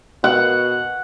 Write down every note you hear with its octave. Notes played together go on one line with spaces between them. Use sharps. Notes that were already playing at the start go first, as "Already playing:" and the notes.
B2 F#5